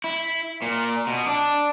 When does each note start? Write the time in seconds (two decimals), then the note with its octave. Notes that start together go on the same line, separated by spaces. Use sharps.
0.04 E4
0.62 A#2
1.07 B2
1.27 D4